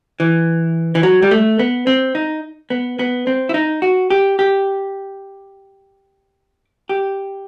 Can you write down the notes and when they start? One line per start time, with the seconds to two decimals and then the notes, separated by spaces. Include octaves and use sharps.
0.20 E3
0.95 E3
1.03 F#3
1.22 G3
1.31 A3
1.59 B3
1.87 C4
2.15 D#4
2.70 B3
2.99 B3
3.27 C4
3.49 E4
3.54 D#4
3.82 F#4
4.10 G4
4.39 G4
6.89 G4